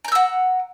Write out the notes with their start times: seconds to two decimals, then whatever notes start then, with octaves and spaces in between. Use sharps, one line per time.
0.05 A#5
0.08 G6
0.12 E6
0.15 F#5